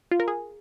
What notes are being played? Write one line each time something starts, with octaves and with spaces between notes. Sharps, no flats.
F4
A#4
G#4